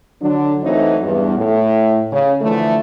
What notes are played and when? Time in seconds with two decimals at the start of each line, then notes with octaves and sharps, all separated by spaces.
0.21 D3 F#3 D4
0.63 E3 F#3 A3 C4 D#4 E4
1.02 E2 G2
1.36 A2
2.12 C#3
2.41 D3 E3 F3 A3